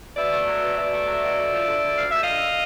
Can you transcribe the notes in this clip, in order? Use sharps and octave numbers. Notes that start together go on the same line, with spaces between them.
B2 D5 E5
A3
F#3
B2
B2 D5 E5
A3
F#3
B2
D2
F3
D3
D2
D2 F5
F3 E5
D#5 F5
D3